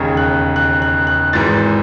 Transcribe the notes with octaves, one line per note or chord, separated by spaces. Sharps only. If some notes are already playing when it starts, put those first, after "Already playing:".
Already playing: E1 D#2 C#3 G#6
F#6
F#6
F#6
F#6
G#1 G#2 E3 A6